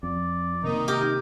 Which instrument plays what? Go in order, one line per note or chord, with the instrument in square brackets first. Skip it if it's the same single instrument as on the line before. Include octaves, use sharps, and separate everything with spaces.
[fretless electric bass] F2 [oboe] D5
[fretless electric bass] C3 A#3 [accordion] D#3 D#4
[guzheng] G4 [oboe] A#4